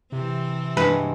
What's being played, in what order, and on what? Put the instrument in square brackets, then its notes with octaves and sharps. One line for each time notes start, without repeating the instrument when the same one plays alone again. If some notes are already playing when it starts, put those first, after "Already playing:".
[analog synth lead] C3 [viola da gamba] E3 C4
[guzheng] G2 G#3 F#5 [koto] B4